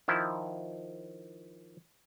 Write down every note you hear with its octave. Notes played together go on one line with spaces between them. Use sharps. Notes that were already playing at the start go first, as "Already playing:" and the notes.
D#3 F3 E4